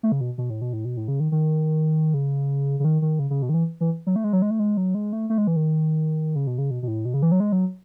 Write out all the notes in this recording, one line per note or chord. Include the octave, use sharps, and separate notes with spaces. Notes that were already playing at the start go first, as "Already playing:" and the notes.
A3
C#3
B2
B2
A2
B2
A2
B2
A2
C#3
D#3
D#3
C#3
C#3
D#3
D#3
C#3
C#3
B2
D#3
E3
E3
F#3
A3
G#3
F#3
G#3
A3
G#3
F#3
G#3
A3
A3
G#3
E3
D#3
C#3
B2
C#3
B2
B2
A2
B2
C#3
E3
F#3
G#3
F#3